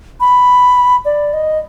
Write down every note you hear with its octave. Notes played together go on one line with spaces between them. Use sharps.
B5
D5
D#5